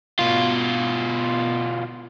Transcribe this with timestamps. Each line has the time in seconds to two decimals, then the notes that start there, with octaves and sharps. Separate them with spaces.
0.19 B2 F4